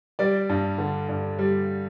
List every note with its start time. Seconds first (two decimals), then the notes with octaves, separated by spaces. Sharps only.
0.19 G3 D5
0.49 G2
0.78 D3
1.09 G2
1.39 G3